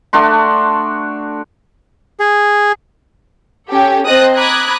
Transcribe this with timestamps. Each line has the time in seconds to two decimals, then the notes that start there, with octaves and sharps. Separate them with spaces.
0.13 A3 D4 F#4 C6
2.20 G#4
3.68 C#4 G4 A4
4.05 C4 C5 D#5 A5 D#6 F#6
4.35 A#5 B5 D6 D#6 F#6 G#6